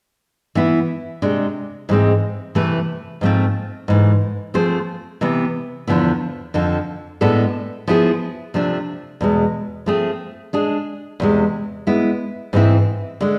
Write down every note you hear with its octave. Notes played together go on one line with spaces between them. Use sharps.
E3 B3 E4
C3 G#3 D4
G#2 E3 G#3 C4
C3 E3 A3 E4 B4
G#2 F3 A3 C4 F4
G#2 E3 A3
F3 A3 C4 G#4 C5
C3 E3 B3
E2 D3 F3 B3 E4
F2 D3 F3
A2 G#3 B3 D4 A4
F3 B3 E4 G#4
C3 F3 A3 D4
E2 B2 G#3
F3 A3 C4 G#4
G#3 D4 G#4
E2 C3 G#3
G#3 B3 E4
G#2 E3 G#3 C4 E4
D3 G#3